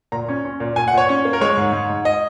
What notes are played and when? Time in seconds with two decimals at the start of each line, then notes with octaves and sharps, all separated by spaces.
0.12 A#2 A#5
0.28 C#4
0.45 C#4
0.60 A#2
0.76 A#2 G#5
0.88 F#5
0.93 A#2 C#5
1.09 C#4
1.25 A#3
1.33 A#4
1.41 G#3 C#5
1.57 G#2
1.72 G#2
1.89 G#2
2.05 D#5